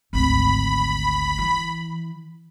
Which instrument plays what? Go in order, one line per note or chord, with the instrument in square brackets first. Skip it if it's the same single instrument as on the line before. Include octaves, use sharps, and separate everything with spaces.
[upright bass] G#1 D2 [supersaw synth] B5
[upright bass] E3